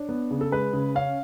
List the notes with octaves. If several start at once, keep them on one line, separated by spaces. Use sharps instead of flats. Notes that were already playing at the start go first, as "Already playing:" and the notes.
Already playing: D4 C#5
B3
C#3
A4
G#3 B4
C#3
C#4 F5